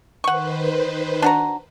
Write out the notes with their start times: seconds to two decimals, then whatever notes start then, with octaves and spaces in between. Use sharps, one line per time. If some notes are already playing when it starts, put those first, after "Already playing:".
0.24 D#3 B4 C5 F#5 C#6
1.22 D4 F#4 A#5